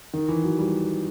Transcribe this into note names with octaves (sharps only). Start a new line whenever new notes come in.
D#3
E3
F#3
G3